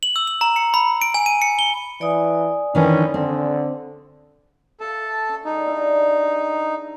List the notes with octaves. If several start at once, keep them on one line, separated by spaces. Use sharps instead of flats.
F#7
E6
F#7
A#5
C#7
B5
D7
G#5
D#7
C#7
G7
E3 D5 G#5 D#6
D#3 E3 C#4 D4
D3 C4
A4 E5 F5 A5
C#4
G3 D#4 G#4
D4 E4 D5